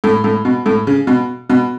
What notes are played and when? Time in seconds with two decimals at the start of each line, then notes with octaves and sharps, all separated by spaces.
0.04 A2
0.24 A2
0.45 B2
0.66 A2
0.87 C#3
1.07 B2
1.50 B2